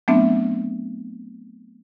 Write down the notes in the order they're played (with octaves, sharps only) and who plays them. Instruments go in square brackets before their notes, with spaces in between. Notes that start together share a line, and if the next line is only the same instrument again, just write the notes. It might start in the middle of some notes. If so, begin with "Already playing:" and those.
[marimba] F#3 A3 B3 C4 D4 E5